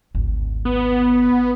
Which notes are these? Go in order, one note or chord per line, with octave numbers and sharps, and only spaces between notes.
G#1 D2
B3